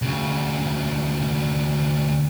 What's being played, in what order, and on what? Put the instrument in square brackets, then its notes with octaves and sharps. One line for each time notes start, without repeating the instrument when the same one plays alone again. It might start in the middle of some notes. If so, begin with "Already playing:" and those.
[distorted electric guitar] D2 C#3